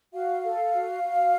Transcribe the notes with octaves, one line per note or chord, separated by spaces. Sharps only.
F#4 F5
A4
F#4
F#4